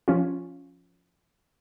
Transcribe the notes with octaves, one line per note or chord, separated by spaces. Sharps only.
F3 C#4 F4